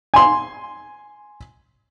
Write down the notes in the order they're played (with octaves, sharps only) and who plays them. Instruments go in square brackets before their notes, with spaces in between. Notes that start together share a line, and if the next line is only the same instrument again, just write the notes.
[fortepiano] G#5 C6